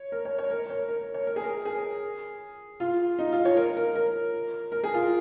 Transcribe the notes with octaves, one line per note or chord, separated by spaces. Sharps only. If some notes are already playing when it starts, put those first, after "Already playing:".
Already playing: C#5
A#4
C#5
C#5
A#4
C#5
A#4
C#5
A#4
G#4
A#4
G#4
F4
D#4
F4
C#5
A#4
A#4
A#4
A#4
G#4
F4